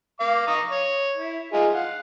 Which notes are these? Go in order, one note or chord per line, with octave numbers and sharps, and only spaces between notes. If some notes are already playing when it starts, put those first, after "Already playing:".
F5 D6
A#5 C#6 D#6
C#5
E4
D#4 F4 G#4
F5 F#5